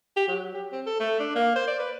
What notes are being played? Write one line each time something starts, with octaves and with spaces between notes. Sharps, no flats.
G4
F#3
G4
C4
A4
A3
D4
A#3
C5
D5
B4